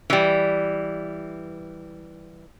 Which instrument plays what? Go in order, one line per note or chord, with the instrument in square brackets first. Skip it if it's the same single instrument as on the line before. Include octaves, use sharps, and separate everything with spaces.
[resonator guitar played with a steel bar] E3 G3